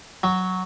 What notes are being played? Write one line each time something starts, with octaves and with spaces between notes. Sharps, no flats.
F#3